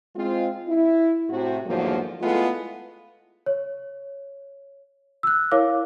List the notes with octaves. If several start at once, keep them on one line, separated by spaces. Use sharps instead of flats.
G#3 C4 F4
E4
A2 C3 F#4
E2 G#2 D3 F3 F#3 A#3
G#3 A3 B3 E4 F4
C#5
E6 F#6
E4 A#4 C#5 F5 D6